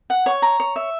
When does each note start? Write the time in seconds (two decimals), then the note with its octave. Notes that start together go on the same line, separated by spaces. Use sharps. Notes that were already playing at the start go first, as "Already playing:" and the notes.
0.10 F#5
0.26 C#5
0.42 A#5
0.60 C#5
0.76 E5